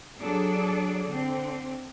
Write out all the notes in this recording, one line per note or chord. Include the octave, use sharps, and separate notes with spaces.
F#3 D4 G#4 A4 D5
D3 C4